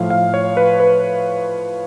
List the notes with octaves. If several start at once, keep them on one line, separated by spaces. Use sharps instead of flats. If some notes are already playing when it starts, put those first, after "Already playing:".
Already playing: A2 F3 F5
F5
C#5
B4
B4